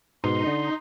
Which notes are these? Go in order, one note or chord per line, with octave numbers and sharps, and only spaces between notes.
G#2 B2 D#4 C6
D3